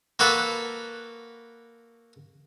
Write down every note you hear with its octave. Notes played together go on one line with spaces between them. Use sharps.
A#3 F#4 A4 B4